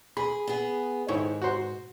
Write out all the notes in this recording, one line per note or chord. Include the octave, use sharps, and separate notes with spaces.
G#4 B5
B3 G#4
G#2 D#3 E4 C#5
F#4 C5